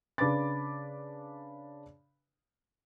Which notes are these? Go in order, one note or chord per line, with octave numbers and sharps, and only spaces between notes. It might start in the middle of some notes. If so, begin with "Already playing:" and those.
C#3 D4 B4 B5 D6 A6